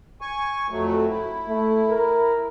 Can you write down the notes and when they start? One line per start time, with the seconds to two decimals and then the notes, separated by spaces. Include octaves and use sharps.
0.21 G#5 C#6
0.70 F2 F#3 A3
1.09 E4
1.49 A3
1.90 A#4